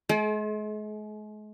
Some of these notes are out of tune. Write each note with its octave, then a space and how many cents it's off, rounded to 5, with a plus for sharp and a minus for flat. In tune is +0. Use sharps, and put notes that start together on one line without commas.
G#3 +40 A4 -40